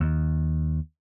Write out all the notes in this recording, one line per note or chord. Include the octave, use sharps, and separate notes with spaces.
D#2